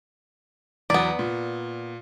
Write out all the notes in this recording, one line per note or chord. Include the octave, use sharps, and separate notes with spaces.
E2 F#3 B3 D5
A#2